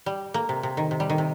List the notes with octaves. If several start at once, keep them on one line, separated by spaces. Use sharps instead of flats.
G3
A#3
C3
C3
D#3
C3
G3
D#3
C3